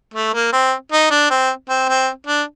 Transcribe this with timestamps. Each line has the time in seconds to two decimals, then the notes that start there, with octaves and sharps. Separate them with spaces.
0.14 A3
0.34 A#3
0.53 C4
0.92 D#4
1.11 D4
1.30 C4
1.69 C4
1.88 C4
2.27 D4